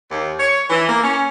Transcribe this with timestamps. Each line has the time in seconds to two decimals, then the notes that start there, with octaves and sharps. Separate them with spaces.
0.09 D#2
0.39 C#5
0.70 E3
0.87 A#3
1.02 C#4